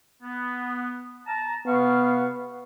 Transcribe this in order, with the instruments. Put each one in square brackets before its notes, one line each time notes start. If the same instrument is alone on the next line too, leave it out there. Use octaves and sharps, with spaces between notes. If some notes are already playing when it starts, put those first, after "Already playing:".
[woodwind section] B3
A5 A#5
[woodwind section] C3 F5 C#6 [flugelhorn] B3